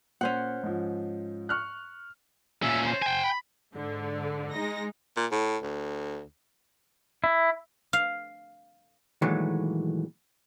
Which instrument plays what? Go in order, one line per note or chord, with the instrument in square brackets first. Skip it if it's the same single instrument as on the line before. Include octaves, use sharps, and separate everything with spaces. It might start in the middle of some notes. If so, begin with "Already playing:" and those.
[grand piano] A#2 [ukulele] C#4 C5 F#5
[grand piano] G#2 F3
C#6 F6 F#6
[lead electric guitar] A#2 C#4 [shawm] E5
[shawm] C5
[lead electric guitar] G5 G#5
[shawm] B5
[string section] G#2 D3
G#3 D#4 A#6
[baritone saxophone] A#2
A2
D2
[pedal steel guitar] E4
[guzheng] F5
[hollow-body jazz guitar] A#2 D#3 E3 F#3 G#3 A3